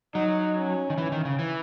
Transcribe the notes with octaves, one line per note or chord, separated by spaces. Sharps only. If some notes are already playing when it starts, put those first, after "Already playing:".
F#3 D#4
C#4
D#3
E3
D#3
C#3
E3